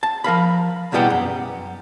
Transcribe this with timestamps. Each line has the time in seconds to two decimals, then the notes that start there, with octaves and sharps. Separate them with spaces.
0.03 A5
0.24 F3 A#4 F5 B5
0.92 E2 B2 E3 G3 B3 G4
1.10 F#2